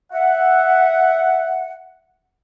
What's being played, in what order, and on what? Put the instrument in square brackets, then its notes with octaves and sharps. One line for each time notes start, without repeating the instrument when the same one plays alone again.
[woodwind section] E5 F#5